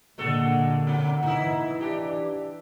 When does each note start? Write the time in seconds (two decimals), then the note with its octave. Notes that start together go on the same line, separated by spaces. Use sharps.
0.18 A#2 D3 G#3 A#3 F#4 A4
0.87 B2
1.23 E3 D#4 E4
1.81 D4 G4